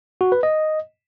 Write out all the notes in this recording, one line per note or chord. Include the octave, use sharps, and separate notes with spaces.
F#4
B4
D#5